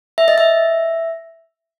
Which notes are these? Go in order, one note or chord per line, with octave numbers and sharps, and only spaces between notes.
E5
D#5
E5